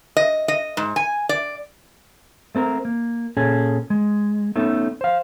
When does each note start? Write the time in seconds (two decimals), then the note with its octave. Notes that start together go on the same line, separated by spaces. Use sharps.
0.17 D#5
0.48 D#5
0.77 G#2
0.96 G#5
1.29 D5
2.55 A3 C4 A4 A#4
2.85 A#3
3.37 A#2 C#4 G#4 A4
3.90 G#3
4.56 A3 B3 C#4 D#4 A4
5.01 C5 F5